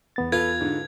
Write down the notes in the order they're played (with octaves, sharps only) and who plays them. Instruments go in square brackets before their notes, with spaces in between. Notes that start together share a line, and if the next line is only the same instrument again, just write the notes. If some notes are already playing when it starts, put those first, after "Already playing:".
[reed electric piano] E2 B3 A6
[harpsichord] F4 [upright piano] A4 B4 [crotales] G#6
[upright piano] G#2 D3